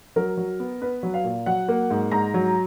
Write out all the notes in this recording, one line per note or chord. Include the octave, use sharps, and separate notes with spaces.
F#3 A#4
F#3
B3
B3 B4
F#3
F5
A#2
F#3 F#5
A#3
G#2
G#2 A#5
F#3